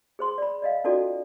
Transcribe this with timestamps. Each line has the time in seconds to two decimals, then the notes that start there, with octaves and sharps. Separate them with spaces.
0.19 G#4 C5 C6
0.38 D5 B5
0.62 D5 D#5 F5
0.84 C#4 D#4 F4 F#4 A4 D5